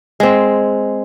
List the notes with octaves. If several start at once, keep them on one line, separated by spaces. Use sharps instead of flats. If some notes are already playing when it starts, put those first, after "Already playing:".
G#3 C4